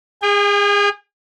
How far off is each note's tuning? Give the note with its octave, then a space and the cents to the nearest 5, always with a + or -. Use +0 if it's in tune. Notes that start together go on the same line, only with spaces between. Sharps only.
G#4 -30 G5 +40